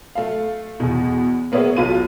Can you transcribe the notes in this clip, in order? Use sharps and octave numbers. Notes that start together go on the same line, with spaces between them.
A3 F5
E2 B2
A#3 B3 G#4 C#5 E5
B1 F#3 F4 D#7